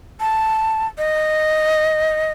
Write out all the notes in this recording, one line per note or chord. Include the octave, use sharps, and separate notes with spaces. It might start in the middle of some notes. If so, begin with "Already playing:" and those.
A5
D#5